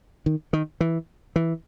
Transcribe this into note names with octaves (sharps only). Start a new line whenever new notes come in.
D#3
D#3
E3
E3